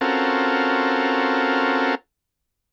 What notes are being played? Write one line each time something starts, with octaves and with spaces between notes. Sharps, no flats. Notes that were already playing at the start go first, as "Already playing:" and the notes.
C4 C#4 F4 F#4 A4 A#4